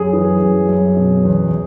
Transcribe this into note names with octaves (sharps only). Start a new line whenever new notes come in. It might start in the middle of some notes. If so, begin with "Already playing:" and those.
Already playing: F#2 G#4
E3
F#2
F#2
B2
E2